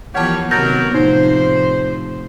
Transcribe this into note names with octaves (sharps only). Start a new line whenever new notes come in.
E3 F3 B3 G4 A#4 C#5 F#5 A5
C3 D#3 F#3 B3 A#4 G6 A6 A#6
A2 C3 F3 D#4 C5